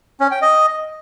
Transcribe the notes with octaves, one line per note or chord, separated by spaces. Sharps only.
C#4
G5
D#5